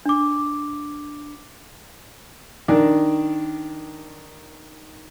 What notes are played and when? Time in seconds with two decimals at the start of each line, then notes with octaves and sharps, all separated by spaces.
0.06 D4 D6
2.68 D#3 D4